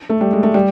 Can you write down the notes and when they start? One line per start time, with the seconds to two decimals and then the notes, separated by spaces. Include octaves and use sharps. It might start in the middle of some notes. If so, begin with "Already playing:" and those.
0.10 A3
0.21 G3
0.33 G#3
0.43 A3
0.54 G3